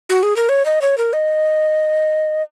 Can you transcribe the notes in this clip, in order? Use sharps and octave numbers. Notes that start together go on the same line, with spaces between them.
F#4
G#4
A#4
C#5
D#5
C#5
A#4
D#5